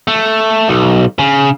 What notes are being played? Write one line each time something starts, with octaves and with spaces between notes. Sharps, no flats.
A3
B1
C#3